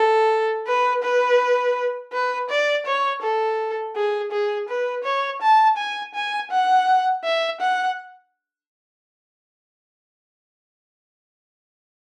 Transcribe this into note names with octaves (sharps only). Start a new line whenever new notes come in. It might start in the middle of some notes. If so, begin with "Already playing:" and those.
Already playing: A4
B4
B4
B4
D5
C#5
A4
G#4
G#4
B4
C#5
A5
G#5
G#5
F#5
E5
F#5